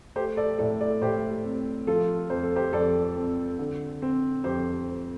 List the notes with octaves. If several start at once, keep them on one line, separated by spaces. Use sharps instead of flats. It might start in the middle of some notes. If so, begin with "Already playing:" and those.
A3 G4 C5
A4 D5
A2 A4 D5
A4 D5
A2 G4 C5
C4
F3 F4 A4
F2 C5
A4
G4 C5
F2 A4 D5
C4
D3
C4
F2 G4 C5